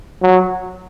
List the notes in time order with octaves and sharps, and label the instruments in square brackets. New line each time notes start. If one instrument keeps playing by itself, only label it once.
[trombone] F#3